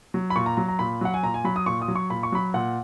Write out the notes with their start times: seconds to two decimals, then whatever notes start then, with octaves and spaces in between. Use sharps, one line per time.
0.14 F#3
0.30 B5
0.36 A#2 C#6
0.46 A#5
0.57 F#3 A#5
0.68 A#5
0.79 A#2 B5
1.01 F#3 F#5
1.14 G#5
1.23 A#2 A#5
1.34 G#5
1.44 F#3 B5
1.56 D#6
1.66 A#2 C#6
1.82 D#6
1.88 F#3
1.95 C#6
2.10 A#2 B5
2.23 C#6
2.32 F#3 B5
2.54 A#2 F#5